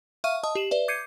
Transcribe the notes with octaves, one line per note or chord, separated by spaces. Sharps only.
E5 F5 C#6 F6 D#7
D#5 A5 D#6
G4 E7 F#7
B4 D5 E5
D6 G6 G#6 C7 C#7 D#7